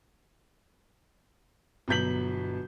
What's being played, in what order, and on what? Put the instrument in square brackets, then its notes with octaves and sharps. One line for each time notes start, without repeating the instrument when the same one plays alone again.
[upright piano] G1 B2 F#3 G6 B6 F#7